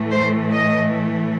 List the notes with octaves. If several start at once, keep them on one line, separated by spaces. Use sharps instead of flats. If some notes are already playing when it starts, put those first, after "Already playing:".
Already playing: A2 E3 A3
C5
D#5